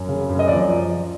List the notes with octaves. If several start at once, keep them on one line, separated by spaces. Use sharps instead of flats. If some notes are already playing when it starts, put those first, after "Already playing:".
Already playing: F#2
C#3
F#2
D#5
F3 D5